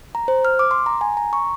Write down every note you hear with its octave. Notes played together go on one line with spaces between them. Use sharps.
A#5
C5
F6
D6
C6
A#5
G#5
A#5
C#6